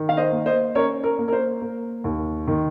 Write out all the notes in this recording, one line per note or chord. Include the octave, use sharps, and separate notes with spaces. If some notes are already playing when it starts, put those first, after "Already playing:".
Already playing: D#3
F5
C5 D#5
A#3
C5 D#5
C#4 A#4 C#5
A#4
A#3
A#4
C5
A#3
D#2
D#3